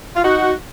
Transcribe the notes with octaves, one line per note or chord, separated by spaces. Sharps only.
F4
D#4 F#4